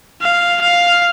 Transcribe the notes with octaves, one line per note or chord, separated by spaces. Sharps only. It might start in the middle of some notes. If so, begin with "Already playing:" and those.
F5
F5